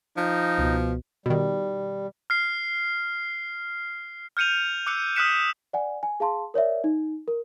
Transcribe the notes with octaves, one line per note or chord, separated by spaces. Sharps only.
F3 D#4
C#2 B2
B2 D#3 G3
F6 C7
F6 G6 C#7 D#7 F7
D6 E6 F#6 C#7
D#6 F6 F#6 B6 C#7 E7
D5 F#5 G#5
G#5
G#4 F5 A5 C6
A#4 C#5 D5 E5
D#4
A#4